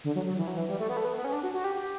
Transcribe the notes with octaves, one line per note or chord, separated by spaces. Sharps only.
D3
F#3
F#3
E3
F#3
E3
G3
A3
B3
A3
B3
B3
C#4
D4
F#4
F#4
G4
G4